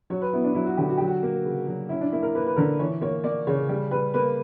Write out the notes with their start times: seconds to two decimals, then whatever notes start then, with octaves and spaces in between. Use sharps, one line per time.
0.10 F#3 C#5
0.22 B4
0.33 B3 E4
0.44 D4
0.55 F#3 E4
0.66 F#4
0.77 D3 G4
0.89 F#4
0.97 F#3 G4
1.07 F#4
1.23 A#3
1.45 C#3
1.67 F#3
1.89 C#4 E4
2.01 D4
2.12 A#3 E4
2.23 A#4
2.35 A#3 B4
2.47 B4
2.56 D3 A#4
2.79 E3 C#5
3.01 A#3 C#5
3.24 A#3 D5
3.47 C#3 C#5
3.69 G3
3.91 G3 B4
4.14 A#3 B4